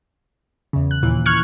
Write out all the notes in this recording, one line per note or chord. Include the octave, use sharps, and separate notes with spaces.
E2 C#3
F#6
D#2 A#2 E3
C#6 F6 F#6 G#6 C#7